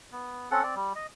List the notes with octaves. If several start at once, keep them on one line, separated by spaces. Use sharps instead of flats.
B3
C4 C#4 A4 F#5
C4 D5
G3
D#5